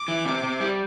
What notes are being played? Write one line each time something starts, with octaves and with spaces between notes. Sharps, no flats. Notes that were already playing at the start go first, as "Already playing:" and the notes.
Already playing: D6
E3
C3
C3
G3